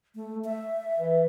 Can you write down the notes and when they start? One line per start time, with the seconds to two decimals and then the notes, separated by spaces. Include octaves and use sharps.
0.15 A3
0.44 E5
0.98 E3